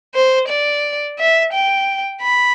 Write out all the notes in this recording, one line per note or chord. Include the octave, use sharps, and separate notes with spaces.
C5
D5
E5
G5
B5